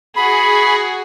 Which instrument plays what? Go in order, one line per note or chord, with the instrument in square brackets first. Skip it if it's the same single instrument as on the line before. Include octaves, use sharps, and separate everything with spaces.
[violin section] F#4 G#4 [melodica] B5